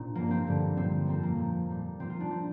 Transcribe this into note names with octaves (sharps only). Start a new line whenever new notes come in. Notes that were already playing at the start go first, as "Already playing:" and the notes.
Already playing: A#2 C4 D4 F4
G2 F3 A#3
C4
G2 D3 G3
A#2 G3 C4
F2 F3 C4
A#3
A#2 F3
A#2 G3
A#2 F3 C4
F4
D4
F3 C4